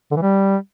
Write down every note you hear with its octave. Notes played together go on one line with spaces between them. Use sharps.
D3
E3
G3